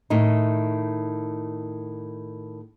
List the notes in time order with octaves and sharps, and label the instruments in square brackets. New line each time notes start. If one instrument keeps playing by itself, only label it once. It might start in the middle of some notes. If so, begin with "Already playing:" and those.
[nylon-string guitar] A2 D#3 D#4